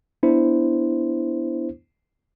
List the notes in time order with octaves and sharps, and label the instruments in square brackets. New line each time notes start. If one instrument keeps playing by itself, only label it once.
[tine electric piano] B3 D4 E4 C5